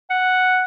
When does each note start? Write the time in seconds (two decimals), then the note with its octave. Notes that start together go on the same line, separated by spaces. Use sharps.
0.10 F#5